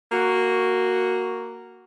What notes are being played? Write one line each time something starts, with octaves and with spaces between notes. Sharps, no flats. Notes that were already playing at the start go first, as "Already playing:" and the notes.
A#3 F#4